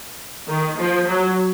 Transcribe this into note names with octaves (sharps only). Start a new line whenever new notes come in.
D#3
F3
F#3